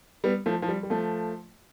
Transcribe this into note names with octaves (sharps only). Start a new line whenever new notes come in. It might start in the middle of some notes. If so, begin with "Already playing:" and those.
G3 B3
F3 A3
F3
G3
G3
F3 A3